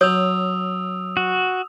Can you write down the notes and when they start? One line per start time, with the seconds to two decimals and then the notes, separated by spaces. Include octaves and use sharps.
0.01 F#3 C#5 D#6 E6 F7
1.17 F#4